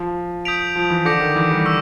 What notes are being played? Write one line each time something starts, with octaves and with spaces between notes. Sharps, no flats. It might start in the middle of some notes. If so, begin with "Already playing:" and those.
Already playing: F3
D#6 G6 B6 D7 F7
F3
E3
D3 D6 G6 A#6 C#7
D#3
E3
G3
C#6 E6